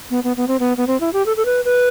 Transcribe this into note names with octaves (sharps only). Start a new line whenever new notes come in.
B3
B3
B3
C4
B3
B3
C4
E4
G4
A4
A4
B4
B4